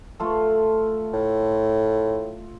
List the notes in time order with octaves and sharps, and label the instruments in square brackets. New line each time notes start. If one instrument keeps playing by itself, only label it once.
[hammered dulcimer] A3 F4 A4
[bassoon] A2